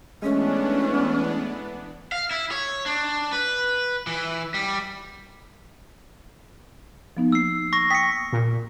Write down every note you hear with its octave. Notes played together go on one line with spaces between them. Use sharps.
E3 G#3 A3 B3 C#4 D4
F5
E4
C#5
D4
B4
E3
G3
F3 B3 D#4
A#3 E6 C7
C#6 A#6
G5 D#6 A6 B6 C#7
A#2